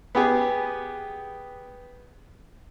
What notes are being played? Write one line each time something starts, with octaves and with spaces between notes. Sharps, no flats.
B3 G4 G#4